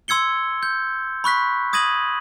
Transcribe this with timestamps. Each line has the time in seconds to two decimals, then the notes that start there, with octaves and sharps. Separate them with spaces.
0.08 C6 E6 G#6 C#7 G7
0.63 G6
1.24 B5 C#6 F#6 B6
1.73 D#6 G#6 A#6 D#7 F#7